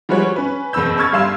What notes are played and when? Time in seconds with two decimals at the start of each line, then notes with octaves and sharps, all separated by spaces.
0.09 F3 G3 G#3 F#4 B4 C#5
0.36 C#4 B4
0.73 F#1 E2 B2 B5 E6 G6
0.97 B5 C#6 E6 F6 G#6 A6
1.12 G1 G3 F5 C6 E6 E7